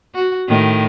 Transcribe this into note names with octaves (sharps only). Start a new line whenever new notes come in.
F#4
A2 D#3